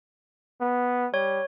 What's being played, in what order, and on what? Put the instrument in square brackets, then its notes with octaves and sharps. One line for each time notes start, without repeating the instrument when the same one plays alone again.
[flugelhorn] B3
[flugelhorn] G3 [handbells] C#5